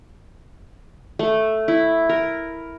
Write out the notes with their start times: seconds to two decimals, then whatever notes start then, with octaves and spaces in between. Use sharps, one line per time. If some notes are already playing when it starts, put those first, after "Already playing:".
1.19 A3
1.68 E4
2.09 A#4